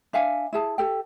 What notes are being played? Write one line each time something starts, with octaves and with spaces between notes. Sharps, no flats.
D4 E5 F5 G#5
E4 G#4 A5
G4 A4 G5